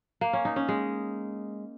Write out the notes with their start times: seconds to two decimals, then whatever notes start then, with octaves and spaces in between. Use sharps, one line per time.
0.21 A#3
0.33 C#4
0.45 D#4
0.56 C#4
0.68 G#3